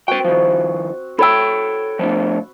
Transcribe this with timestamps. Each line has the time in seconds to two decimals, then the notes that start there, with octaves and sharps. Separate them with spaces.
0.08 C4 F#4 B4 G5
0.25 D#3 F3
1.19 A4 C#5 G5 B5 E6
1.99 F3 A3 D4